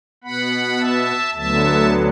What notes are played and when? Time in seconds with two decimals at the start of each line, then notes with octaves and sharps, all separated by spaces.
0.24 B2 B3 F#5 B5
0.79 E5 A5
1.34 D2 D3 F#3 B3 E5 A5